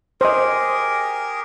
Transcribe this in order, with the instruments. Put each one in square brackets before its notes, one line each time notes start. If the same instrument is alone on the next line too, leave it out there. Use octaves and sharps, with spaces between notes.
[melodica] G4 G#4 A#4 [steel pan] C5 D#5